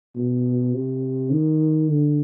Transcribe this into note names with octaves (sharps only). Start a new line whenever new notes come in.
B2
C3
D#3
D3